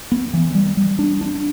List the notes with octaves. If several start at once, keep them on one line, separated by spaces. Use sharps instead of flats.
B3
E3
G3
G3
D4
D4